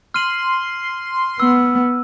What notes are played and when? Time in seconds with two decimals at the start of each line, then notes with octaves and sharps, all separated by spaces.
0.14 C6 F6 D#7 F#7
1.40 B3 E6